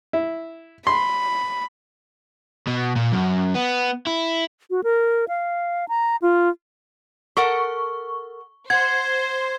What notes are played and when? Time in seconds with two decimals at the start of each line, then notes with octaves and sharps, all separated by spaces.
0.13 E4
0.87 B5 C6
2.67 B2
2.96 A#2
3.13 F#2
3.55 B3
4.07 E4
4.70 F#4
4.84 A#4
5.28 F5
5.89 A#5
6.22 F4
7.37 A4 A#4 F#5 C#6
8.70 C5 F#5 G#6